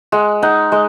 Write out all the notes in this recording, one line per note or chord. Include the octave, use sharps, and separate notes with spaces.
G#3 F#5
D#4 F#5
G#3 D#5